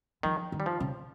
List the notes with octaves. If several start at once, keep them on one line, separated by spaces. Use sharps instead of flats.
D#3 F3
D#3
G3
F3
C#3